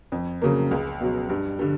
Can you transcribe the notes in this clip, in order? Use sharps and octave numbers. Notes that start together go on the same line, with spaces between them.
F2
C#3 F#3 A#3
C#2
B2 F#3
G2
D3 G3